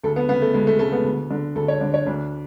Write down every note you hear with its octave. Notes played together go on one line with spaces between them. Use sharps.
D2 A4
B3
C#3 B3
A3
D2 G#3
A3
C#3 A3
B3
D2
D3
D2 A4
C#5
D3 D5
C#5
D2 D4